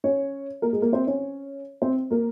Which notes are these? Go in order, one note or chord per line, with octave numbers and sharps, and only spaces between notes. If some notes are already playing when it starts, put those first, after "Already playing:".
C#4 C#5
A#3 A#4
G#3 G#4
A#3 A#4
C4 C5
C#4 C#5
C4 C5
A#3 A#4